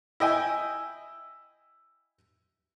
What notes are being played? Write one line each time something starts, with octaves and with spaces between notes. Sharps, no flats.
E4 D#5 G5 G#5